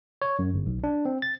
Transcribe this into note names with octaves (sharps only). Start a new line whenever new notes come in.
C#5
F#2
G1
B1
D4
C4
A6